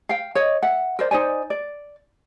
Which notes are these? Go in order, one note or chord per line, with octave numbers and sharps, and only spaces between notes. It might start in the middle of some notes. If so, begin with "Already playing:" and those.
F5 G5
C#5 D#5
E5 F#5
A#4 C5 D5
D#4 C5 D5 G#5
D5